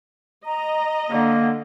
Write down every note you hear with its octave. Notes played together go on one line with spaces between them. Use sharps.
D#5 A#5
D3 A#3